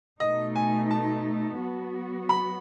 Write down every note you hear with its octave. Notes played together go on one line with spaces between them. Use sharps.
B2 A3 D#4 D#5
G#5
A5
F#3 B3 F#4
B5